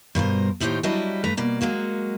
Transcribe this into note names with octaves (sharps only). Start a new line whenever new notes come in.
G2 B2 A#4 C5
D#2 A2 D#4 G4 C5 C#5
F#3 G3 D4 E4 F#4 D#5
G2 A3 B4 A#5
B2 A#3 D5
F#3 G#3 A#3 F#4